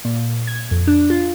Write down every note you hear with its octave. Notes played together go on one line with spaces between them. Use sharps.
A#2
G#6
F2
D4
F4